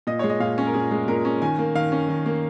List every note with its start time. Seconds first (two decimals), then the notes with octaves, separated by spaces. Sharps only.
0.07 A#2 D#5
0.19 G#3 C#5
0.30 D#5
0.40 A#2 F5
0.58 C#4
0.67 A#4
0.74 A#2 G#4
0.91 G#3
1.08 A#2 A#4
1.25 C#4
1.42 D#3 G#5
1.59 A#3
1.75 D#3 F5
1.92 C#4
2.09 D#3
2.26 A#3